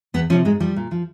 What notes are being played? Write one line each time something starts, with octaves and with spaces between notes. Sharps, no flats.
E2 B3
C3 F3 C#4
G#2 G#3
F3 G3
A#2
F3